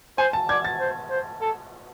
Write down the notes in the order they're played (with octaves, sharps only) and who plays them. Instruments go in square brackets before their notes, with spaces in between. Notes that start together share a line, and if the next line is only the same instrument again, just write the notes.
[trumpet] C5 [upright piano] G#5
[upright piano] A5
[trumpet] D5 [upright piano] G#6
[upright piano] A6
[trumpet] C5
C5
A4